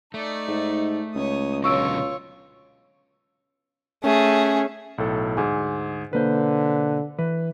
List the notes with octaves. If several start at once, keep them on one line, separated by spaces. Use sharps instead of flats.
A3 D#4 D5
G#2
C#2 C#5 D#6
B2 D3 F#3 F4 C#5 C#6 E6 D7
A3 C#4 G#4
B1 A2 A4
D2 G#2 G#4 G#5
B1 D3 A#3 B4 C5
E3 B4